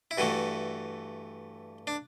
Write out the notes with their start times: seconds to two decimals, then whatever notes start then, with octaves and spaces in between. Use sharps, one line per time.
0.11 E4
0.18 G2 E3 A3 F#4
1.87 D4